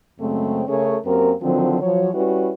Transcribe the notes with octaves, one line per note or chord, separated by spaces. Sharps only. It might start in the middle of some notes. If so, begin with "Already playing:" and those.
F#2 C#3 G#3 A3 C4
C#3 A3 C#4 G#4 A#4 C#5
F#2 A#3 C4 G4 A#4
D3 D#3 F3 F#3 C4
F3 F#3 C#5
G3 C#4 E4 F#4 B4